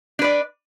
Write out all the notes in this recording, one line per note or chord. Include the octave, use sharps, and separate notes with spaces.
D4 B4 D5